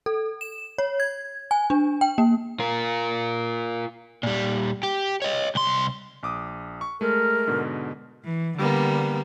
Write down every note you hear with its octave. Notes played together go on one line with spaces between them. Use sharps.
A4
E7
C#5
G#6
G#5
D4
G5
A#3
F4 A#4
A#2 G3
G4
C#5 D#5
C2 C6
A#1 D6 D#6
C#6
G#3 A3 A#4
G#2 B2 D3
E3
D3 G3 A#3 B3